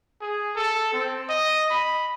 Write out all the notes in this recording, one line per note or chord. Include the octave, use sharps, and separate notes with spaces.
G#4
A4
C4
D#5
B5